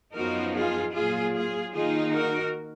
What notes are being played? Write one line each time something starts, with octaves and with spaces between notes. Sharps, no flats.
F#2 F3 B3 D#4 F#4 A#4
F4 G#4
A#2 F#3 A#3 F4 G#4
F4 G#4
D#3 A#3 D#4 F4 G#4
F#4 A#4